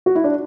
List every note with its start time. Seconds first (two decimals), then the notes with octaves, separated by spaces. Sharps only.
0.06 F#4
0.15 E4
0.24 D4